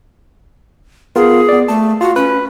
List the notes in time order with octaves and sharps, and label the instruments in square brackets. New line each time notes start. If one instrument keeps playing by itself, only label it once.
[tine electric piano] B3 F4 A#4 [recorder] G#4
[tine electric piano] B3 D5
[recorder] A3 [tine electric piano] A5
[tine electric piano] F4 [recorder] F#4
[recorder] C#4 [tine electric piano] B4